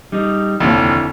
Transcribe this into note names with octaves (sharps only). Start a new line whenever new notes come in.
G3 D#4
F1 D#2 D3 C4 E4